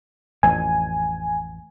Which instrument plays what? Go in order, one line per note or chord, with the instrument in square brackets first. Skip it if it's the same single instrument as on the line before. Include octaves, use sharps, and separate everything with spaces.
[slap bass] A1 F2 [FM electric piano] G#5